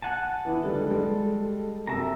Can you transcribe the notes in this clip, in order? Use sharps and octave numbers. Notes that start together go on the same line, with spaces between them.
F#5 G#5 A5
E3 B3 E4
C#2 D3 G3 A4
G3 G#3
F#2 C3 E5 A5 A#5